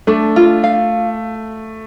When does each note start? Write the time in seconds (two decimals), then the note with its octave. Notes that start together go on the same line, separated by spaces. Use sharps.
0.07 A3 D4
0.36 F4
0.64 F5